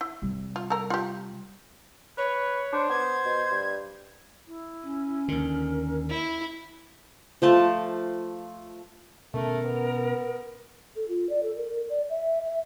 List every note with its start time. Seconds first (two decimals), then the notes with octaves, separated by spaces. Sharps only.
0.01 E4
0.22 C3 G3
0.56 F4
0.70 A4 A#4
0.90 F4 G4
2.18 B4 C#5
2.73 D4 C5
2.89 B3 G#6
3.25 B2
3.51 G2
4.48 E4
4.83 C#4
5.28 D#2 D3 A#4
6.10 E4
7.42 F3 A3 A5
9.34 B2 A3 C#4 A#4
9.65 B3
10.96 A4
11.08 F4
11.30 D5
11.43 A4
11.56 A#4
11.89 D5
12.10 E5
12.44 E5